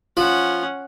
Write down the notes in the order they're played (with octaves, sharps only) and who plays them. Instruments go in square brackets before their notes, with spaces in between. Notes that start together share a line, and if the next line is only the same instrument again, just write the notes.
[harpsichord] F3 [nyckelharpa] C#4 F#5